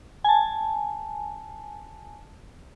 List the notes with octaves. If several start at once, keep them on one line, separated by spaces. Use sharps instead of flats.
G#5 A5